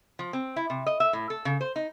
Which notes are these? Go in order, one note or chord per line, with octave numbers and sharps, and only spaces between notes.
F3
C4
E4
C3
D#5
E5
A2
A4
C#3
C5
D#4